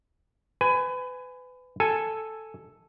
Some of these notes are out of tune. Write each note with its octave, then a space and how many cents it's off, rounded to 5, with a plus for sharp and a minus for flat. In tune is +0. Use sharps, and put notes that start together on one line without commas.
B4 +30 G#5 +0
A4 +0 G#5 +0